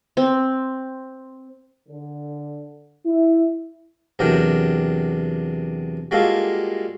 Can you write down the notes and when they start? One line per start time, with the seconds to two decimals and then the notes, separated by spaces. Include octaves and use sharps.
0.17 C4
1.89 D3
3.05 E4
4.19 E2 C3 F#3 D4 A#4 G5
6.11 G3 G#3 A#3 F4 F#4 A4